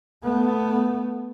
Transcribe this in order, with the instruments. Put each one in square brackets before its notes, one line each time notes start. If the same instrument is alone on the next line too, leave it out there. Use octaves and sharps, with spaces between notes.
[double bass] A3 B3